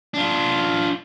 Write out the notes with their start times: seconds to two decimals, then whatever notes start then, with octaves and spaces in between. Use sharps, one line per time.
0.14 D4 F4